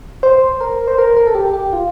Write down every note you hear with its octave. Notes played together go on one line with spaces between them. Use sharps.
C5
A#4
C5
A#4
A#4
A4
G4
G4
F4